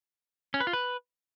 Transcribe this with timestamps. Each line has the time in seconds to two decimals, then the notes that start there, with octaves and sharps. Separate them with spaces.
0.54 C#4
0.60 B4
0.67 F4
0.73 B4